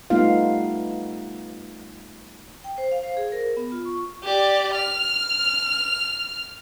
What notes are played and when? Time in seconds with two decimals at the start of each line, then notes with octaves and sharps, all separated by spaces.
0.10 G3 A3 B3 D#4 F4 F5
2.64 G5
2.78 C5
2.92 F5
3.03 C5
3.17 G#4
3.32 A#4
3.57 B3
3.72 F4
3.85 C#6
4.24 G4 D5
4.74 F6